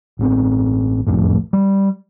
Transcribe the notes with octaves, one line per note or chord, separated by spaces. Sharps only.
A1 B3 C4
F#1 C2 F2 A2
G3